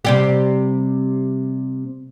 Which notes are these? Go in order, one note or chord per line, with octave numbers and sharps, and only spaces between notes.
C3 G3 G4